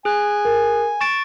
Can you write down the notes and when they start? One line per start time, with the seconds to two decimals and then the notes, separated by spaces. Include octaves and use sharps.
0.05 G#4 G#5 F#6
0.45 A#4
1.01 C#6 A6 D7 E7